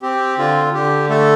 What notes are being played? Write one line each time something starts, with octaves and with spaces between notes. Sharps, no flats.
C4 G4
D3 F4
D3 G4
A3 A4